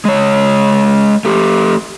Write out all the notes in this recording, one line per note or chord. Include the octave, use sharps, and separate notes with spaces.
G#3 C#5
A3 G4